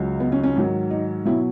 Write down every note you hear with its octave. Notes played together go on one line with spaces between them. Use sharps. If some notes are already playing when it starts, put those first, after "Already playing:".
Already playing: C#2 C#3 F#3
B3
C#4
C#4
G#2 D#3 F#3
D#4
B2 F#3 E4